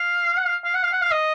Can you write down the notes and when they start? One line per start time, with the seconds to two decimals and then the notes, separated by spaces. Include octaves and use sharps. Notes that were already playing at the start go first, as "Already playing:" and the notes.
Already playing: F5
0.37 F#5
0.46 F5
0.65 F5
0.74 F#5
0.83 F5
0.93 F#5
1.02 F5
1.11 D#5